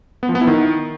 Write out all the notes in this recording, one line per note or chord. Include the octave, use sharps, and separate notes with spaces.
B3
F3
B3
E4
D#3